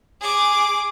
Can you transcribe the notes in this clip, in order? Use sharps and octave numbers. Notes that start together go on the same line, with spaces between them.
G#4 D6